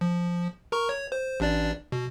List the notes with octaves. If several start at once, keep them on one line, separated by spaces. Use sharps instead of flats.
F3
A#4 A#5 C#6
C#5
C5
A1 D4 D5
B2